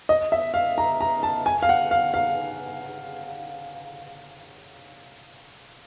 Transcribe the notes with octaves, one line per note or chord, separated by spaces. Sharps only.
D#5
E5
F5
A#5
A#5
A5
G#5
F5
F#5
F5
F5